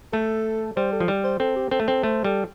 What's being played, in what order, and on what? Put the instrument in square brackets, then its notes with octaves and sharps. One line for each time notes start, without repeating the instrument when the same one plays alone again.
[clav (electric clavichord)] A3 [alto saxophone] A4
[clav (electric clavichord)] G3 [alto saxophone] C5
[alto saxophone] A4
[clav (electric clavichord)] F3
G3
[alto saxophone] C5
[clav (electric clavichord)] C4 [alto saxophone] A4
[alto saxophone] G4
[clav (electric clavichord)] C4 [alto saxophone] A4
[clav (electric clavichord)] A3
[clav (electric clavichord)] C4 [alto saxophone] A4
[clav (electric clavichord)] A3 [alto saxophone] C5
[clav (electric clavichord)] G3 [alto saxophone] A4